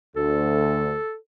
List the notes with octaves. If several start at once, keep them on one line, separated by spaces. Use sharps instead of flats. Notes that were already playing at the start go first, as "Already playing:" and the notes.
D2 A4